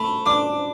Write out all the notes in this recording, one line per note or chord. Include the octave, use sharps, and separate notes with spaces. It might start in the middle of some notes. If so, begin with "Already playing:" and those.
Already playing: A3 B5
D4 D6